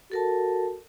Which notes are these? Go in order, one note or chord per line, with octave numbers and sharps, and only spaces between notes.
F#4 A4 A#4 A5